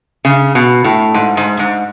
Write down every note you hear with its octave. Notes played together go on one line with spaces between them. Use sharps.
C#3
B2
A2
G#2
G#2
G#2